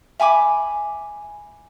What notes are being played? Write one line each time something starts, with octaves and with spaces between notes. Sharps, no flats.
E5 G#5 B5 D6